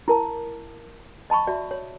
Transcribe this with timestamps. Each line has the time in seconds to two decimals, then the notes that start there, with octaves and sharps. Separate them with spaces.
0.08 E4 A#4 A5
1.30 D#5 A5 B5 C#6
1.47 F#4 D5 E5
1.71 C#5